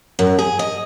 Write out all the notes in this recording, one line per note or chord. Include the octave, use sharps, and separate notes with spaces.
F#2
G#4
D#5